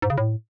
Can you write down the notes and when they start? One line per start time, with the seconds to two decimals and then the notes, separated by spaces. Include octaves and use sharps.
0.02 G#2
0.10 C#3
0.18 A2